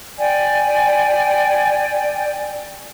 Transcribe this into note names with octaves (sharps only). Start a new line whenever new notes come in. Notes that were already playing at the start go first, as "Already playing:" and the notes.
D5 G5 G#5